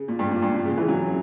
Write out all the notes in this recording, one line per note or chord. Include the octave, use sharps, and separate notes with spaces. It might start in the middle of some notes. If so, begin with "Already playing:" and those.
Already playing: C#3
A#2
G2
A#2
G2
A#2
C#3
E3
F#3